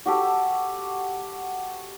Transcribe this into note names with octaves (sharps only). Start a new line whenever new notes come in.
F#4 G4 A4